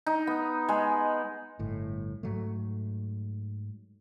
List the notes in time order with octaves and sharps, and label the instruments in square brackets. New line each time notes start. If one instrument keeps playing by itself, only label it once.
[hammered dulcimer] D#4
B3
G#3
[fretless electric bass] G1 A2
G#2 F#3 A3